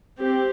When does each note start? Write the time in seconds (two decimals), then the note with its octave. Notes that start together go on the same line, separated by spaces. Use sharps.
0.20 C4 G4